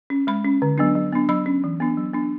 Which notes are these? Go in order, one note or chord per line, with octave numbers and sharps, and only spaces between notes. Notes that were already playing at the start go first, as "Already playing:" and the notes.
C#4
G#3 B5
C#4
D3
F#3 B3 D4
F#3
B3 D4
F#3 B5
C#4
E3
B3 D4
F#3
B3 D4